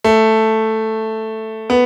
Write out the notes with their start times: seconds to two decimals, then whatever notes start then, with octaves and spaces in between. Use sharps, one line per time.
0.04 A3
1.70 B3